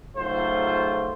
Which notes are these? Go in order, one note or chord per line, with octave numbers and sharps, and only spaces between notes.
C#2 G#2 F#3 A3 F4 C5